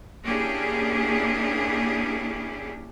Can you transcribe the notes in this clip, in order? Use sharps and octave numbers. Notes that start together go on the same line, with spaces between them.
A#3 C#4 D4 E4 G4 G#4